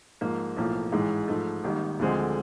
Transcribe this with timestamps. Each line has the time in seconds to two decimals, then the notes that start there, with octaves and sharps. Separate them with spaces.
0.21 G#2 F3 A#3
0.57 B1 A2 F3 A#3
0.92 A1 G#2 E3 G#3
1.28 G#2 F3 A3
1.64 G#1 G#2 D#3 G3 A#3
1.99 D2 D3 F3 G#3 C4